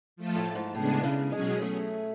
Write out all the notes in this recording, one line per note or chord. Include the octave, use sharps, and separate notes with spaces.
F3 A3 F4 A4
A2
G#2
A2 C#3 G#3 B3 D4 G#4
C#3
B2 F#3 G#3 C#4 G#4
A3